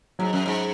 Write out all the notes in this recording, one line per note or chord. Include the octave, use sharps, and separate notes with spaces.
G#2 F#3
F#2
G#2